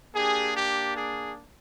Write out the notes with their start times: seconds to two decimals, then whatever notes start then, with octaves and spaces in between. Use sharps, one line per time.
0.14 A#3 D4 G4 G#4
0.55 G4
0.95 G#4